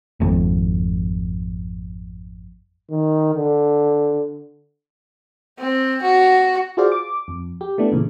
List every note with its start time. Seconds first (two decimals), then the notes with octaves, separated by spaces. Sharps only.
0.20 G#1 F2
2.91 D#3
3.35 D3
5.58 C4
6.02 F#4
6.77 F4 F#4 G#4 C5 D5 F5
6.92 D6
7.28 F2
7.61 G4
7.78 A3 B3 D4 E4
7.92 A#2 C#3 E3